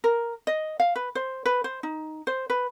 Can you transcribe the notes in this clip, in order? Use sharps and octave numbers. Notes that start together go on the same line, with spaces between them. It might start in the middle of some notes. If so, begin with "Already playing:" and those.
A#4
D#5
F5
B4
C5
B4
C5
D#4
C5
B4